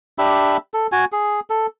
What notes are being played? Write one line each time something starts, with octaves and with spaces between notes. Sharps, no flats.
D4 G4 E5 B5
A4
F#4 G#5
G#4
A4